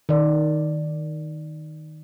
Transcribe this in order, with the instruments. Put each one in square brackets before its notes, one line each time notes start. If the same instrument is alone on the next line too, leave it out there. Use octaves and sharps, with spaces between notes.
[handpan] D#3 D5